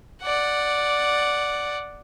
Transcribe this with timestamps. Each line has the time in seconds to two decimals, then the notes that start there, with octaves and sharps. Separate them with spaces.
0.22 D5 F#5